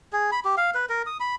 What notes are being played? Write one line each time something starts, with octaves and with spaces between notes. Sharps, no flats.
G#4
B5
G4
F5
B4
A#4
D#6
B5